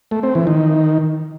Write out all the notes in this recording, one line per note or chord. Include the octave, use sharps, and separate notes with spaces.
A3
C4
E3
D#3